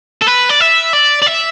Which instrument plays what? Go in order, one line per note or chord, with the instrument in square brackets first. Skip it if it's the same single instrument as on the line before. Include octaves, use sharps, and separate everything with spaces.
[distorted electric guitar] A4
B4
D5
E5
D5
D5
E5